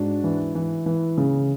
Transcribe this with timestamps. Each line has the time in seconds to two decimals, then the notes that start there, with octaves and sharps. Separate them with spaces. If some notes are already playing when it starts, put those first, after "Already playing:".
Already playing: G#2 D4 F#4
0.24 E3
0.55 E3
0.86 E3
1.18 C#3